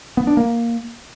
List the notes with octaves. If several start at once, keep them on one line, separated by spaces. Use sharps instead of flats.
B3
D4
A#3